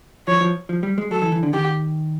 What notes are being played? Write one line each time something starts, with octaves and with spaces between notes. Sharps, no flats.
F3 C#5
F3
F3
G3
G#3
F#3 A4
E3
E3
D3
D#3 G4